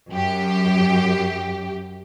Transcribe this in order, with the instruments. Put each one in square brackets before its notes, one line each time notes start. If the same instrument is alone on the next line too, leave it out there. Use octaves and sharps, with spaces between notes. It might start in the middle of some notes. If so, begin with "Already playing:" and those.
[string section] F#2 G4